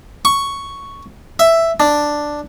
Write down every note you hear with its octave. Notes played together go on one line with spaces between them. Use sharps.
C#6
E5
D4